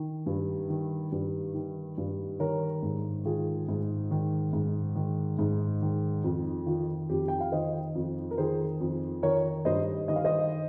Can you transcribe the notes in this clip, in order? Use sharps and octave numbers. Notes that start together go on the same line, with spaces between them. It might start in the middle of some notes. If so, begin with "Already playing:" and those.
Already playing: D#3
G2
D#3
G2
D#3
G2
D#3 A#4 C#5
G#2
D#3 F4 G#4
G#2
D#3
G#2
D#3
G#2
D#3
F2
D#3 F4
F2 G4
G5
F5
D#3 C5 D#5
F2
A#4
D#3 G#4 C5
F2
D#3 A#4 C#5
G2 C5 D#5
D#3 D#5
F5
C5 D#5